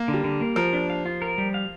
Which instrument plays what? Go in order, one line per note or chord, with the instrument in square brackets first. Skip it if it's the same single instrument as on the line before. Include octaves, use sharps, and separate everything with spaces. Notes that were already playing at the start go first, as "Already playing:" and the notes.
Already playing: [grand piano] A#3
[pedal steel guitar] D3
[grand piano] G3
[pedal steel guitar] D3
A#3
[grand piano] F3 [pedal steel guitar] A#4
[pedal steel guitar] D4
F5
F4
A#4
G3
F5